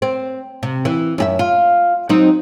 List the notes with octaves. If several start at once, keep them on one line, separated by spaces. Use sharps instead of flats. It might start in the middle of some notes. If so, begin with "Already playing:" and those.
C4
C3
E3
F#2 G4 E5
F4
F#3 C4 D#4